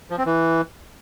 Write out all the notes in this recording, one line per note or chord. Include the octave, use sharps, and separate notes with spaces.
F3
C4
E3